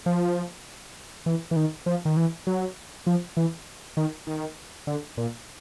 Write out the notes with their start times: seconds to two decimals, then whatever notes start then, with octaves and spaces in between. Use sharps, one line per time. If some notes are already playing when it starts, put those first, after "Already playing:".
0.06 F3
1.26 E3
1.51 E3
1.56 D#3
1.86 F3
2.05 D#3
2.17 E3
2.47 F#3
3.07 F3
3.37 E3
3.97 D#3
4.27 D#3
4.87 D3
5.17 A#2